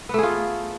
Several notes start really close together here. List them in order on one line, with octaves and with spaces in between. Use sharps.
B3 A3 G#4 F4